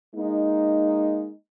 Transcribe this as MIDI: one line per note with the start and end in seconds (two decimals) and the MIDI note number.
0.15 1.33 56
0.15 1.33 58
0.15 1.33 63